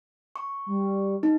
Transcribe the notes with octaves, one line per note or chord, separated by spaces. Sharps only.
C#6
G3
D#4